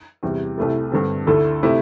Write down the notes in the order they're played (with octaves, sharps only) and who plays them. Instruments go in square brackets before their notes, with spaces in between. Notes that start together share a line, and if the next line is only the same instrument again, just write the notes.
[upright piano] E2 C3 G3
C2 C3 A3 E4 A4
G2 D3 C4 A4
D2 D3 A3 E4 A4
C3 A3 E4